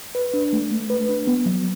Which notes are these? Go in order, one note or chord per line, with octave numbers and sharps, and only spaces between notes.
B4
D4
A3
A3
B4
D4
B3
F#3